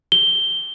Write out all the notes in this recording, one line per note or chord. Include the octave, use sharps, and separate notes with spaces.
G7